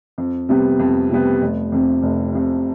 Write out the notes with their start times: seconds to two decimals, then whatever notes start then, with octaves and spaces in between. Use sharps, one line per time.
0.18 F2
0.49 C3 G3 B3
0.79 F2
1.10 C3 G3 B3
1.42 F1
1.72 F2 C3
2.03 F1
2.35 F2 C3